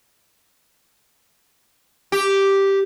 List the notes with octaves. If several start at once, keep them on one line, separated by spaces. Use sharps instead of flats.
G4